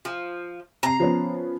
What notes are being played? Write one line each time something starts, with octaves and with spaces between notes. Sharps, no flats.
F3
C3 A#5 C7
F3 B3 C#4